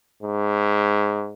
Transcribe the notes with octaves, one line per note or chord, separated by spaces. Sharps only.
G#2